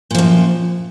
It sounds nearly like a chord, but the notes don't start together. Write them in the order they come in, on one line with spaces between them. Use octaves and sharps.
A#2 F3 F#2